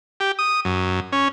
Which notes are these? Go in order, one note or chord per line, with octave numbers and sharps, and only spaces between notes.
G4
D#6
F#2
C#4